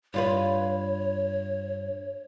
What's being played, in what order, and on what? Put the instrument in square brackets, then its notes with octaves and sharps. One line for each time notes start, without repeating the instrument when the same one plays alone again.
[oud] G2 F4 B4 [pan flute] C#5